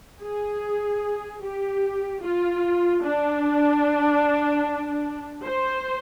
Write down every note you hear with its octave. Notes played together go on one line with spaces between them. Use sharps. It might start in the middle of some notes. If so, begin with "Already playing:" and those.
G#4
G4
F4
D4
C5